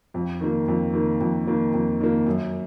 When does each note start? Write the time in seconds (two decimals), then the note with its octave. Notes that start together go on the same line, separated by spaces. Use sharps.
0.14 F2
0.41 D#3 A#3
0.68 F2
0.93 D#3 A#3
1.20 F2
1.47 D#3 A#3
1.73 F2
2.00 D#3 A#3
2.27 F#2